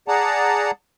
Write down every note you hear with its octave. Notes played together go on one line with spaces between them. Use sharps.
G#4 D5 F#5 A5 A#5